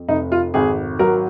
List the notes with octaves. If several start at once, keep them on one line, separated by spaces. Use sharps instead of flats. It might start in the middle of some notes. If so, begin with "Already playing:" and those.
Already playing: F2
F1 D#4
F4
G#1 G#4
F#3 A#4